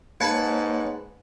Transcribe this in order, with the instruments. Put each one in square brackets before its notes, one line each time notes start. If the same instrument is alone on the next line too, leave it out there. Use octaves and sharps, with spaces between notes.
[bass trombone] G#2 [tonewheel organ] A#3 C#5 F#5 [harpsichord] B4 A5 B5